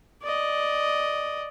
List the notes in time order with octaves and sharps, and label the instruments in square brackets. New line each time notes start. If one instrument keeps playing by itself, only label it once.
[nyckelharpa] D5 D#5